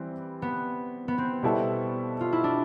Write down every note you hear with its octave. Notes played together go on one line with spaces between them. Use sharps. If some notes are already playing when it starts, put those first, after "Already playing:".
Already playing: E3 G3 C4
B3
B3
C4
B2 G3 B3 E4 A4
F4
E4
D4